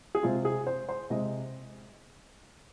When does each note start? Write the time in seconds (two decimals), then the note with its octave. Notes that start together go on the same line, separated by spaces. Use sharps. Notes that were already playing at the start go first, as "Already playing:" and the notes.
0.15 G#4
0.23 C3 G#3 C4 F4
0.45 G#4
0.67 C5
0.89 C5
1.10 C3 G#3 C4 D#5